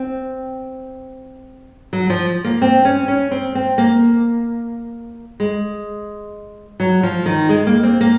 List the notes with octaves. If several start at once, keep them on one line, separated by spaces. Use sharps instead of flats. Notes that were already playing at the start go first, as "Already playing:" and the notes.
Already playing: C4
F#3
F3
A#3
C4
C#4
C#4
C4
C4
A#3
G#3
F#3
F3
D#3
G#3
A#3
C4
A#3